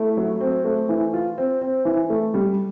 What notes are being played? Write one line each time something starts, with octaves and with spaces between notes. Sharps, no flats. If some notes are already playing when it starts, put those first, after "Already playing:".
Already playing: A3 E4
F#3
C4
A3
E3
F4
C4
C4
E3
A3
G3